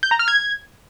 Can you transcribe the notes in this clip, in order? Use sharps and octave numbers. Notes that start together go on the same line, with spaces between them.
G6
A#5
F6
G#6